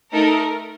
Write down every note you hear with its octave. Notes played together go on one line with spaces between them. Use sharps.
A3 D#4 A4 A#4